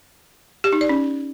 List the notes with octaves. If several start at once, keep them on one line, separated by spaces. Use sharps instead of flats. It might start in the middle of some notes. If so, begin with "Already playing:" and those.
G4
D#4
D5
C#4